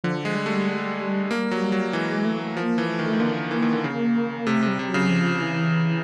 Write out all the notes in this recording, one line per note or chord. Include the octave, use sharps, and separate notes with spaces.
D3 F3
G#3
G3
A3
A#3
F#3
F#3
E3 G#3
A3
F3 A#3
E3
A3
D#3
D#3
D3 A#3
E3
D#3
D3
C#3
C3 A3
C3
G3
C3
F#3
C#3
F3
E3